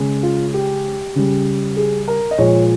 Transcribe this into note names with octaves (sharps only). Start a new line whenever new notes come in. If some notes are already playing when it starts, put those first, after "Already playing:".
Already playing: C#3 G#3
F4
G4
C#3 G3
G#4
A#4
D#5
A#2 F3 G#3 C#5